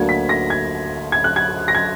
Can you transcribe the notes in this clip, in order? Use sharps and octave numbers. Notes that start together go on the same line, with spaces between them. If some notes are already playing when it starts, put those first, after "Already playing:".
Already playing: D2 D3 F#3 A#3 D4 G#6
B6
A#6
G#6
G#6
F#6
G#6
A#6
G#6